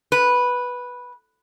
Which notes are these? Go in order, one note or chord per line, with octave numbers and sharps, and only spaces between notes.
B4